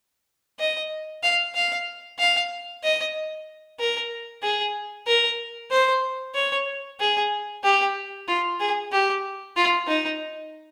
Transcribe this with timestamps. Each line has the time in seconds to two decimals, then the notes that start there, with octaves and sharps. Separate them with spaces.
0.60 D#5
1.23 F5
1.55 F5
2.19 F5
2.84 D#5
3.79 A#4
4.43 G#4
5.07 A#4
5.71 C5
6.35 C#5
7.00 G#4
7.64 G4
8.28 F4
8.60 G#4
8.92 G4
9.56 F4
9.87 D#4